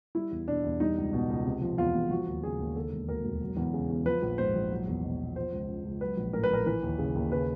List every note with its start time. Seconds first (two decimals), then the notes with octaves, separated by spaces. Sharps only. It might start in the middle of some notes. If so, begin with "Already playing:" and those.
0.15 G3 E4
0.31 E2
0.48 B2 D4
0.64 E2
0.80 G3 D#4
0.97 C#2
1.13 B2
1.29 C#2
1.46 C3
1.61 F3
1.78 E2 F4
1.94 E1
2.10 F3 F#4
2.27 D#2
2.43 C#3 G#4
2.59 D#2
2.75 D3 A4
2.92 E1
3.08 D2 A#4
3.24 E1
3.41 F#3
3.57 E2
3.73 C#3
3.90 E2
4.06 F3 B4
4.22 A#1
4.38 G#2 C5
4.55 A#1
4.71 F#3
4.88 E2
5.04 B2
5.20 E2
5.36 F3 C5
5.52 C#2
5.69 C#3
5.85 C#2
6.01 F#3 B4
6.17 A#1
6.33 A2 A#4
6.44 B4
6.50 A#1 A#4
6.66 E3 B4
6.83 D#2
6.99 C#3
7.15 D#2
7.31 C#3 B4